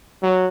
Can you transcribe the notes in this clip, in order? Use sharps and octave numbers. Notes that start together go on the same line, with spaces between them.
F#3